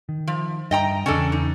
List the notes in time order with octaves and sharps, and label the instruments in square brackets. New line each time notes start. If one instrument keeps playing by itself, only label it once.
[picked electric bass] D#3
[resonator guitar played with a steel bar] F3
[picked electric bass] G2 [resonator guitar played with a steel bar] D#5 G5 A#5
[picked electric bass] E2 C#3 [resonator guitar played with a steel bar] C#4 D4 A4
[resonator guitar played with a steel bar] D#4